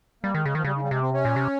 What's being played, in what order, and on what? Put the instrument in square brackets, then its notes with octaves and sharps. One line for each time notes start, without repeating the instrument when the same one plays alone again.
[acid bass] G3 [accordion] A#3
[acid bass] D#3 [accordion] G#3
[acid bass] C#3 [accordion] G#3
[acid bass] D#3 [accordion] F3
[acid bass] C#3 [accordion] G3
[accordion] D#3
G3
[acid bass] C3 [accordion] G#3
[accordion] C4
C#4
[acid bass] A#2
C3